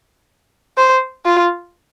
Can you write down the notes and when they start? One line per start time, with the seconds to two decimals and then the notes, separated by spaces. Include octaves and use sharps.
0.78 C5
1.25 F4